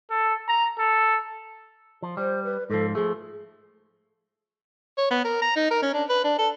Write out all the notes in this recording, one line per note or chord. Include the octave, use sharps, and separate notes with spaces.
A4
A#5
A4
F3
G3 C5
B4
G#2 F3 A4
F3 A3 G#4
C#5
B3
A#4
A#5
D#4
A#4
C#4
D4
B4
D4
A4